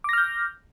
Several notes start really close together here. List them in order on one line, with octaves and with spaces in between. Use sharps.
D6 A#6 F6 G6